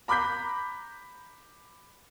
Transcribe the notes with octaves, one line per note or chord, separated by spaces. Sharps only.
A#5 B5 D6 F#6 G6 B6